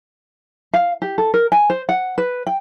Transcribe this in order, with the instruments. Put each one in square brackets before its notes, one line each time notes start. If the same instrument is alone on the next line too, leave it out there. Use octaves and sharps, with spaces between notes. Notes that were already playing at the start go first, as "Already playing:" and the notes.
[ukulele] F5
G4
A4
A#4
G#5
C5
F#5
B4
G5